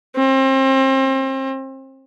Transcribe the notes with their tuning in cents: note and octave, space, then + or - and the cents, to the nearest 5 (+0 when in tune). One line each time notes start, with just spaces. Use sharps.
C4 +35